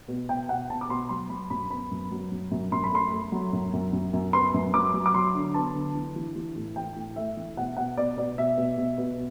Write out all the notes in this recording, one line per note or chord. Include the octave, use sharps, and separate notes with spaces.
B2
B2 G5
B2 F#5
B2 A5
D6
B2 C6
F#3 C6
F#3 B5
F#2 B5
B3 B5
F#2
F#3
F#2
F#2
F#2 C6
B5
A3 C6
A3
F#3
F#2
F#2
F#2
F#2
B3 C6
F#2
F#3 D6
F#3
D6
F#3 C6
D3
B3 A5
D3
E3
E3
E3
A2
E3 G5
A2
A3 E5
E3
B2 F#5
B2 F#5
B2 D5
B2 D5
B2 E5
B2
B2
B2